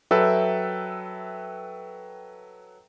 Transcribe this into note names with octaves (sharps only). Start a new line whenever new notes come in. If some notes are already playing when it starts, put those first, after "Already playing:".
F#3 A4 B4 E5 G5